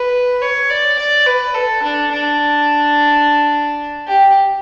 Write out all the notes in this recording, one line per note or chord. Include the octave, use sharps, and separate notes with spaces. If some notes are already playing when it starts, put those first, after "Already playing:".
Already playing: B4
C#5
D5
D5
B4
A4
D4
D4
G4